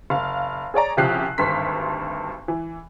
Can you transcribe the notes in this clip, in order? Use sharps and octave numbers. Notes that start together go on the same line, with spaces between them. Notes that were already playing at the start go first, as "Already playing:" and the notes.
F#1 F5
G#4 C#5 D5 A#5
C2 C#3 F3 G4 F#6 C7
G#1 D2 G2 C6 B6
E3